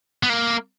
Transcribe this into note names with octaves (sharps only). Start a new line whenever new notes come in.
B3
A#3